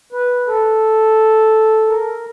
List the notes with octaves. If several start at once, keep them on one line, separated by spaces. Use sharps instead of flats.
B4
A4
A#4